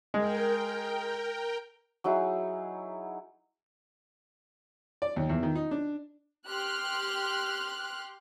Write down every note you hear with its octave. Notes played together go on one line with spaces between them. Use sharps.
G#3 A#4 G5
F#3 D#4 E4 G#4
D5
D#2
E2
D#3
D#4
D4
G4 C6 F6 F#6